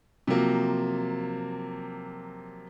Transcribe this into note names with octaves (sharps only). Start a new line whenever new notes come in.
C3 F3 F#3 A#3